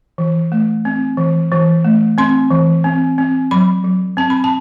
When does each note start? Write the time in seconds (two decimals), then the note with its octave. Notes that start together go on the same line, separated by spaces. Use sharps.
0.18 E3
0.52 A3
0.85 C4
1.17 E3
1.52 E3
1.85 A3
2.18 C4 C6
2.50 E3
2.84 C4
3.18 C4
3.51 F#3 B5
3.84 F#3
4.17 C4 A5
4.30 B5
4.44 A5